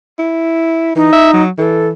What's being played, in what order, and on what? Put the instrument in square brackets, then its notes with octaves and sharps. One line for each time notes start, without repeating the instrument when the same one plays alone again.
[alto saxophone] E4
[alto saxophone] E3 [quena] D#4
[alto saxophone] E5
F#3
[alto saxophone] E3 [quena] A4